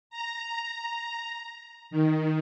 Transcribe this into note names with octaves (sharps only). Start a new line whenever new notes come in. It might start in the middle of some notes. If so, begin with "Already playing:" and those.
A#5
D#3